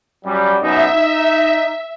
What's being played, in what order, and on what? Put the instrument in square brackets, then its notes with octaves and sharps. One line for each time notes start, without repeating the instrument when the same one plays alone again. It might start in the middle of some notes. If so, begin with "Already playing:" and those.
[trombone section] F#2 G3
[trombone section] F#2 B2 D#4 [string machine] E5
[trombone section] D#4